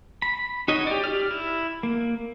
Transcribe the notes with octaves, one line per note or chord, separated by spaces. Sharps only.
B5
D#4 F#4 C#5 D#5
G4 D5
G4 D5 F6
E4
A#3